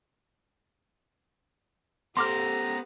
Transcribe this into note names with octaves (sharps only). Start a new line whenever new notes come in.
B3 G4 A4 C5 A#5 C6 D6 F6